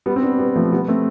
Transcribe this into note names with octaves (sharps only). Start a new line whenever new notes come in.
G3 B3
C4
B3 D4
G3 B3
F3 A3
G3 B3
A3 C4